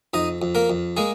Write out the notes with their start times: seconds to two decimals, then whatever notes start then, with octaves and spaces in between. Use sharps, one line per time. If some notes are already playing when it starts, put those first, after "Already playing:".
0.14 F2 D#4 D#5
0.42 F2
0.55 A#3 A#4
0.70 F2
0.97 G#3 A#3 G#4